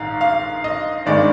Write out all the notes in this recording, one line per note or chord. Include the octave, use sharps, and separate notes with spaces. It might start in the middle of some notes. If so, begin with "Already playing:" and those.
Already playing: A#1 G#2 D#3 F5 A#5
F5
D#5
G#1 G2 D#3 G#3 D5